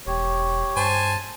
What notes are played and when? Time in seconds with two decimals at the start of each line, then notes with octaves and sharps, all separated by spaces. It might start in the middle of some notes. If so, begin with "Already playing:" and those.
0.07 E1 G4 C#5
0.76 G2 C5 G#5 A5